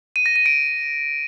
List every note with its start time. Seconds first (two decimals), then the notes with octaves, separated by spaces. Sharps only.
0.16 D#7
0.26 A#6
0.36 D#7
0.46 D7